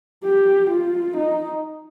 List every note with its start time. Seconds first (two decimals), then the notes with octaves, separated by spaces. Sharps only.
0.24 G4
0.70 F4
1.17 D#4